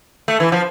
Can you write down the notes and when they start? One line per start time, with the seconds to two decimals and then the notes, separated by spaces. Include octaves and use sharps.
0.28 A3
0.40 E3
0.52 F3